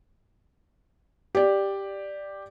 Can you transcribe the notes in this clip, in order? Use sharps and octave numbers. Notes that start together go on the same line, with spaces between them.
G4 D5